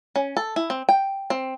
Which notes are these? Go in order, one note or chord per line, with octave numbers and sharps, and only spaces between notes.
C#4
A4
E4
C4
G5
C4